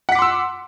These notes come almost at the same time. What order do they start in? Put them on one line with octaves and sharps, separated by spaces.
F#5 B6 D6 C6 E6